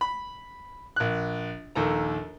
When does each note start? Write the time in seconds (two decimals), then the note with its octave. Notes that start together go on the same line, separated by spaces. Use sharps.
0.01 B5
0.96 A#1 F#6
1.75 A#1 D#2 A4 A#5